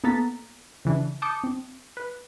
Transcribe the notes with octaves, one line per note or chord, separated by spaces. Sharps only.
A#3 B3 A4 A#5 A6 B6
C#3 E3 D4
A5 D6 D#6 G6 C#7
C4
B4